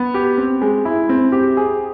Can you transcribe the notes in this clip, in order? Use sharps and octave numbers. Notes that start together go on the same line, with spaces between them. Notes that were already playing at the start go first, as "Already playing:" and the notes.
Already playing: B3
G4
C4
G#3
E4
C4
G4
G#4